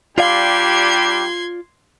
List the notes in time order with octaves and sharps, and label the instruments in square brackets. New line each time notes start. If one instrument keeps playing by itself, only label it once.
[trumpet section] G3 D4 G4 [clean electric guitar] F4 D5 F5 [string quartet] C6 G#6